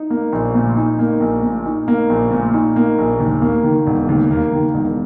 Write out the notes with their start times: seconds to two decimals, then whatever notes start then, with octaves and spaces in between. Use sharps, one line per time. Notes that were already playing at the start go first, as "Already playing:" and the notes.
Already playing: D#4
0.10 A#3
0.32 A#1
0.55 A#2
0.77 D#4
0.99 A#3
1.20 A#1
1.43 A#2
1.66 D#4
1.88 A#3
2.09 A#1
2.31 A#2
2.53 D#4
2.76 A#3
2.98 A#1
3.20 D#2
3.42 A#3
3.63 D#3
3.86 E1
4.09 D#2
4.31 A#3
4.52 D#3
4.74 E1